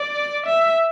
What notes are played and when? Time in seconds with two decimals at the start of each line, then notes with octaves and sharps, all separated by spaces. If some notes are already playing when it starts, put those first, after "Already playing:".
Already playing: D5
0.46 E5